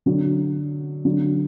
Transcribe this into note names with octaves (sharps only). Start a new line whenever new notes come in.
D3 F#3
D3 F#3